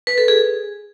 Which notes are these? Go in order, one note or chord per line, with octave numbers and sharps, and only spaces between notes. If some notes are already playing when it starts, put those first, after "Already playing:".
B4
A4
G#4